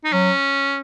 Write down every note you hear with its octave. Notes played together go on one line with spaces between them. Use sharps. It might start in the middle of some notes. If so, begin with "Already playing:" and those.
D#4
F#3 C#4